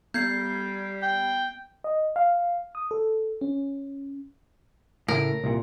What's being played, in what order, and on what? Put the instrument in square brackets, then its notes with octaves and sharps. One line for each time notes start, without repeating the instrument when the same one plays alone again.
[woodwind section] G3 [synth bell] B3 G#6 C7 [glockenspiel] G6
[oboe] G5
[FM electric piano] D#5
F5
D#6
A4
C#4
[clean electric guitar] A2 C#3 [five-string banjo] A#4
[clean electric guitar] C2 A#2